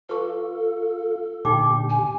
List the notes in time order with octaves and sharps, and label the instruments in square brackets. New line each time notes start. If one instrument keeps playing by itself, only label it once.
[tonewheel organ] F4 [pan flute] A4 [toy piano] B4 C#6
[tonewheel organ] A#2 D3 G4 [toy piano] D#4 G5 D6
[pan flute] G#5